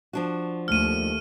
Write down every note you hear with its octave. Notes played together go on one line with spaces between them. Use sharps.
F3 D4 F#4
D#2 A3 F6 D#7